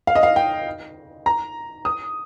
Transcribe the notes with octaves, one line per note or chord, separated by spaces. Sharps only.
F5
D#5
F5
G5
A#5
D#6